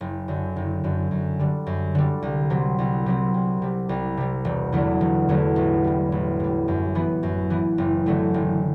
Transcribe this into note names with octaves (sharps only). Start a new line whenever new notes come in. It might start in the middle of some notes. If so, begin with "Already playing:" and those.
F#1
F#2 D3
F#1
F#2 D3
F#2
D3 G3
F#2
D3 G3
C2
C3 F#3 C4
C2
C3 F#3 C4
C2
C3 G3
C2
C3 G3
E1
E2 D3 F#3 A3
E1
E2 D3 F#3 A3
A1
A2 G3
A1
A2 G3
F#2
E3 B3
F#2
E3 B3
F#1
F#2 D3 F#3 A3
F#1